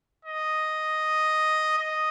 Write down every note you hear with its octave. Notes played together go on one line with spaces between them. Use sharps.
D#5
D#5